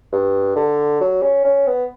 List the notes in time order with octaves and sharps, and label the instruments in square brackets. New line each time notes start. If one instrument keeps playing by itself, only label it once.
[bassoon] G2
D3
F#3
C#4
C#4
B3